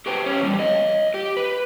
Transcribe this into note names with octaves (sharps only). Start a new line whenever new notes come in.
F#4 G4 B4 C5 G5
C#4 G4
E2 A#2 D#3 F3 G3
C#5 D#5
G4
B4